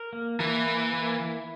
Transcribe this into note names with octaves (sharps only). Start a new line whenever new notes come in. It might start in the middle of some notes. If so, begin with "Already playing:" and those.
Already playing: A#4
A#3
E3 A#3
A#3
A#3
E4